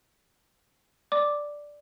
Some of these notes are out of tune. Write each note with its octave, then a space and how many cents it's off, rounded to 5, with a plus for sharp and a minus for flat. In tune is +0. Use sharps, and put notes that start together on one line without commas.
D5 +0 D6 +0